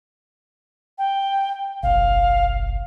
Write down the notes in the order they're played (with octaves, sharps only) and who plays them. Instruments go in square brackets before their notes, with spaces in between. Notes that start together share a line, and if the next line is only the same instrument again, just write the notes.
[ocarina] G5
[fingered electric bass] F#1 B1 [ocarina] F5